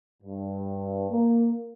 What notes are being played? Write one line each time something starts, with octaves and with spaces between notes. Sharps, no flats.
G2
A#3